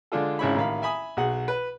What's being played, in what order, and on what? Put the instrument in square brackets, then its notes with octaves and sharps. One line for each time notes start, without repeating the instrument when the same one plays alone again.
[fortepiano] D3 G#3 D4 F4 A4
G#1 C#3 E4 C#5 B5
A1 D#3 F5 B5
E5 G#5 B5 D#6
B1 F#4 G#4 F#5
B4